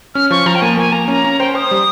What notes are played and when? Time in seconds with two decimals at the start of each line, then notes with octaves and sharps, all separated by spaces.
0.15 C#4 F6
0.31 F3 C#6
0.46 F3 A#5
0.55 G5
0.62 A#3 G#5
0.77 A#3 G#5
0.92 A#3 A#5
1.08 C#4 A#5
1.24 C#4
1.40 C5 G5
1.55 C5 D#6
1.71 G3